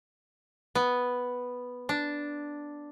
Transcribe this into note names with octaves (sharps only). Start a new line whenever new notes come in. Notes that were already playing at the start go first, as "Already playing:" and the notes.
B3
D4